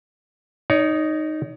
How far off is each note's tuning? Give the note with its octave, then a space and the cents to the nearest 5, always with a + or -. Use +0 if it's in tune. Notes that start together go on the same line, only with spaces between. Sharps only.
D#4 -5 C#5 +35